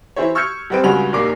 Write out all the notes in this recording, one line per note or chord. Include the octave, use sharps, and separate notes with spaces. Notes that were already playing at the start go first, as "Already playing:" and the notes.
E3 E4 C5 C#5
C#6 E6 F6 G6 G#6 C#7
A1 G3 C4 B4 C5 D7
C#2 G2 C#3 F#4 B5 F7
A#1 D#2 A#3 D6 C7